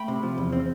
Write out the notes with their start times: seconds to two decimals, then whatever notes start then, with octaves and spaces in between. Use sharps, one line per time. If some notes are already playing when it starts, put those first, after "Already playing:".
Already playing: A3 G5 B5
0.08 C3
0.23 F3
0.38 E2
0.52 C4